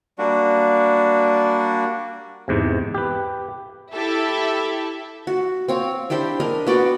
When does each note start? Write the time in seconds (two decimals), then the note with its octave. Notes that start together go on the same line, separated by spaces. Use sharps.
0.19 G3 A#3 D4 F#4
2.48 E2 G#2 C3
2.94 G4 B4
3.94 E4 G4 A4 E5
5.27 F#4
5.68 C4 C#5 F5
6.10 D4 E4 G4 C5
6.40 D4 G#4 A#4 D#5
6.67 B3 F#4 D5 G5